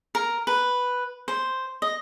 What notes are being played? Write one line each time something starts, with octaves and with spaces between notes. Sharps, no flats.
A#4
B4
C5
D#5